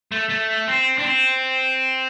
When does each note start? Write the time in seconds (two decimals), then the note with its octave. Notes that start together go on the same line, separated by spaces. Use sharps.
0.12 A3
0.29 A3
0.68 C4
0.98 D4
1.06 C4